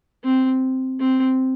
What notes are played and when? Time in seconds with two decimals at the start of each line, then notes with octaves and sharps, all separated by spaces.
0.24 C4
1.00 C4